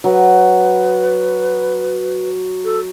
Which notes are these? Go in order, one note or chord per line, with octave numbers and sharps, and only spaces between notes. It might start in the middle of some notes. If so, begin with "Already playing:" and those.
F#3 B4
A4